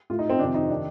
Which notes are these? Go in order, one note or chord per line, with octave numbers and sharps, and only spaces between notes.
A2 F4
D#4
C4
F2 C3 D#3 D4
D#4
D#3 D4